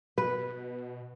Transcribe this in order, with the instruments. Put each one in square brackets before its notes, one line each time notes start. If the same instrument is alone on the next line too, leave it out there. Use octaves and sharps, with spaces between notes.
[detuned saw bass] B2 [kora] B4